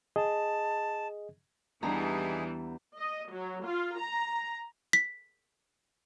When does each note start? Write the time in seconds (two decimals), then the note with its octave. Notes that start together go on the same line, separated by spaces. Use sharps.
0.16 G#4 D#5 A5
1.83 E2 E3 G3 B3 D4 D#4 G#4 A#5
2.98 D#5
3.31 F#3
3.66 F4
3.98 A#5
4.93 B6